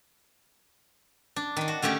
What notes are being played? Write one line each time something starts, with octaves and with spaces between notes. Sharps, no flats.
D4
D#3 D4
F#4
D3 A3 C#4 G4